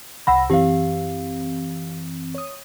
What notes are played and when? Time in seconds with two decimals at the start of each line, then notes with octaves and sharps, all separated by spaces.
0.27 C2 F#5 B5 E6 A#6
0.50 F#2 E3 C4 G4 F5
2.35 C#5 D#6